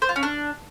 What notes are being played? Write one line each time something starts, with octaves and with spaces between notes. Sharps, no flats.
C5
F4
C#4
D4